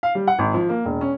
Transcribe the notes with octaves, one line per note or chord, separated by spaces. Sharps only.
F5
G3
F#5
G#1
F3
A#3
E1
C#4